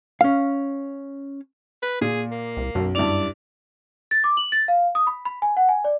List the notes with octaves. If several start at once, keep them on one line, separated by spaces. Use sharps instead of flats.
C#4 F5
B4
A#2 G#4
A#3
C2
B1 F#2
G2 E4 D5 F7
A6
D6
F#7
A6
F5
D#6
B5
B5
G#5
F#5
G#5
D5